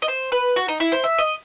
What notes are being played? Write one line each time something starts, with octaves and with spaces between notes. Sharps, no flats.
D#5
C5
B4
F#4
D#4
E4
C5
E5
D#5